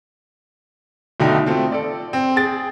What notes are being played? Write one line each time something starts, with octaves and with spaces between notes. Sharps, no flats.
B1 B2 D3 A3 D#4 G5
A3 C4 F4
A4 D5
C4
G#4 G5 A6